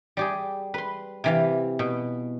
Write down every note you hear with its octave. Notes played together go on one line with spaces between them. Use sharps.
G3 G4 G#4
B4 C6
C3 E3 F5
B2